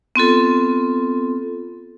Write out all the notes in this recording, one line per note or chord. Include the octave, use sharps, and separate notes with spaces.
B3 C4 F4 A4